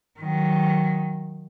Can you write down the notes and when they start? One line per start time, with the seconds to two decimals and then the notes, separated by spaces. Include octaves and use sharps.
0.19 D#3 F#3